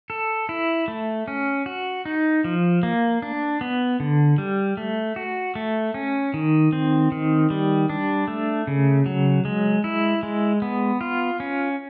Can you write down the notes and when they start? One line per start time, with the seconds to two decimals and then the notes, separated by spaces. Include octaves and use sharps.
0.10 A4
0.49 E4
0.88 A3
1.28 C#4
1.66 F#4
2.05 D#4
2.44 F3
2.83 A#3
3.22 D4
3.61 B3
4.00 D3
4.38 G3
4.77 A3
5.16 F#4
5.55 A3
5.94 C#4
6.34 D#3
6.72 C4
7.12 D#3
7.50 G3
7.89 D4
8.28 A3
8.67 C#3
9.06 F#3
9.45 G#3
9.84 E4
10.23 G#3
10.62 B3
11.01 F4
11.40 C#4